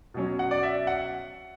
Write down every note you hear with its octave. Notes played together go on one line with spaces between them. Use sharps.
B2 F#3 C#4
F#5
D5
E5
F#5